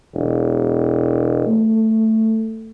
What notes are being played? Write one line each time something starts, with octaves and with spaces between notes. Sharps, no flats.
E1
A3